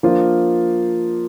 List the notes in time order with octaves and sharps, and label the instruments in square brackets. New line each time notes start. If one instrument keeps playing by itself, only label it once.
[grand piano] F3 A#3 D4 F4 C5